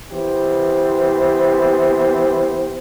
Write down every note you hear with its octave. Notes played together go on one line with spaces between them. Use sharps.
E3 B3 G4 C5